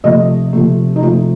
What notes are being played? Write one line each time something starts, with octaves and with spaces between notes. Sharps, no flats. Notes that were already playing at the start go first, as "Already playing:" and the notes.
C3 F3 A3 D#5
C3 F3 A3
D#4
C3 F3 A3 F4